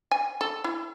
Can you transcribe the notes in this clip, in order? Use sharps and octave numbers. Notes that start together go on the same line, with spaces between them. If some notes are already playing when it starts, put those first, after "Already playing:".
G#5
A4
E4